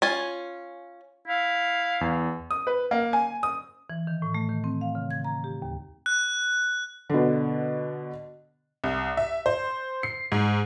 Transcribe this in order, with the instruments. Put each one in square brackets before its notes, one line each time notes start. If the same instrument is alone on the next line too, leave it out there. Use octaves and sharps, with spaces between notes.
[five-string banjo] C#4 F4 G#5
[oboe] E4 [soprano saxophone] F5
[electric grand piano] E2
[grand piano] D#6
B4
A#3
G#5
D#6
[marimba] E3
D#3
A2
A3
D#3
C4
F5
C#3
G#6
A#5
G4
D#2
[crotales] F#6
[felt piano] B2 D3
[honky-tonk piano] C2
E5
C5
C7
G#2